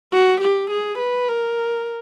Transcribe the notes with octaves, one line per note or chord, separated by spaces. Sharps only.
F#4
G4
G#4
B4
A#4